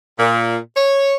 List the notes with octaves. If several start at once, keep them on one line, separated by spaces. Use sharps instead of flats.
A#2
C#5